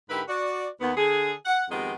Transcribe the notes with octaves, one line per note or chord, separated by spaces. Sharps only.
G#2 D3 E4 G4 A#4 B4
F#4 D5
D#2 B3
D3 G#4
F#5
F2 D#3 G#3 B3 G4 D#5